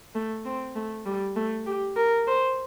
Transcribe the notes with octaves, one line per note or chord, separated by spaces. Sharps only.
A3
C4
A3
G3
A3
G4
A#4
C5